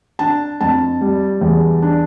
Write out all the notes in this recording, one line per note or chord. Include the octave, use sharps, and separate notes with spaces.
D4 A5
F2 A5
G3
E2
D4